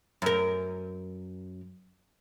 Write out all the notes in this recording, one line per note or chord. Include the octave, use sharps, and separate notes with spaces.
F#2 A#4